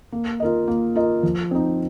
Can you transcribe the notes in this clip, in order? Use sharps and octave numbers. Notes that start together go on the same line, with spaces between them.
A#3
F4 A#4 D#5
A#3
F4 A#4 D#5
F3
C4 D#4